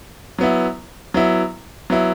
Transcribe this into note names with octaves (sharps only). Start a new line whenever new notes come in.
F#3 B3 E4
F#3 B3 E4
F#3 B3 E4